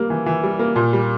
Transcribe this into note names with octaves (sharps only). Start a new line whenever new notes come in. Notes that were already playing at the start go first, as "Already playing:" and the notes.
Already playing: G3 A#3
E3
E3
G3
A#3
A#2
G3